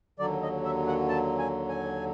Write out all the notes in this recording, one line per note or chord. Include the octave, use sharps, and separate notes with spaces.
D#2 D3 F#3 D5
D#5
E5
F#5
A5
G#5
G#5